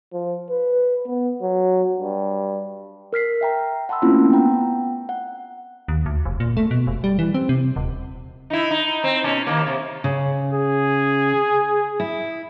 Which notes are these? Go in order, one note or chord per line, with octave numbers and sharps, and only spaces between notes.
F3
B4
B3
F#3
G2
A#4 F6 B6 C7
E5 G5 A#5
F#5 A5 B5 C6 E6
A3 A#3 C4 C#4 E4 F4
B3 F#5 G5 A#5
F#5
D#2
D2
F1
A#2
A3
B2
F1
G3
E3
C4
C3
D#1
D#4 E4
D#4
C4
B2 C#4
D#2 A#3
C3
C#3
G#4
E4